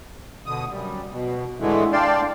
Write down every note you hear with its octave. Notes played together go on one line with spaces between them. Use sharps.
B2 D3 D#6
F#2 G3
B2
A2 D3 E3 G#3 A3
D4 D5 F5 G5 A5 C6